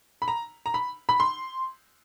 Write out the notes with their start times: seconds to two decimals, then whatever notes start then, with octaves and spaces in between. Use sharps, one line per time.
0.22 B5
0.28 A#5
0.66 A#5
0.74 B5
1.09 B5
1.20 C6